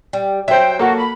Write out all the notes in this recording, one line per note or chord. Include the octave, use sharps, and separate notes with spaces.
G3
F#3 C5 E5 G5
A#3 F#4 A4
B5